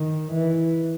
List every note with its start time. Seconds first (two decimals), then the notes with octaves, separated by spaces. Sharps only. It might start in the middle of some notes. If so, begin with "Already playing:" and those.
Already playing: D#3
0.32 E3